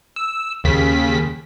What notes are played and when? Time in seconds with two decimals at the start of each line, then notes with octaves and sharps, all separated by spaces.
0.16 E6
0.64 D#2 C#3 B6